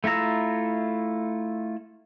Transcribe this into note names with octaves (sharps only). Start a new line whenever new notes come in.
A3 E4 F4 A#5 E6